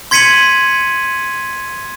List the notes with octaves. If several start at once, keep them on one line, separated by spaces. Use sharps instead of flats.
C6 G#6 B6 C#7 D#7 F#7